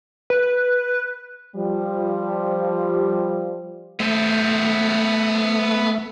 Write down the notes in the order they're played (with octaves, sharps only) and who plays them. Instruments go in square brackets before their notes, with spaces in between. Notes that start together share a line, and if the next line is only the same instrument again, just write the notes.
[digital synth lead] B4
[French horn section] F3 G3
[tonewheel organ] A3 [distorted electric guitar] B3 C5